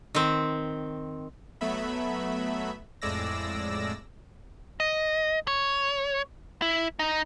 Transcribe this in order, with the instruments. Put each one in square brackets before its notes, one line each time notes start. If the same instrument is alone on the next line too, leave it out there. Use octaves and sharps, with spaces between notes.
[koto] D#3 C4
[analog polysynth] F#3 A3 B3 E5 B5
F2 A2 G#3 D5 E6 A#6
[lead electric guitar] D#5
C#5
E4
D#4